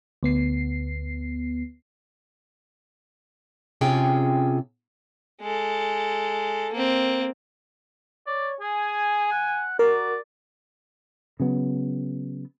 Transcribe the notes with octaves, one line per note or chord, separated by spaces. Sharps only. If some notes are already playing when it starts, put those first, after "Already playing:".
D2 B3 C7
C3 C#4 F4 G#4 G5
G#3 A4
A#3 C4
C#5 D5
G#4 G#5
F#5
F#4 A#4 D5
C#3 F#3 B3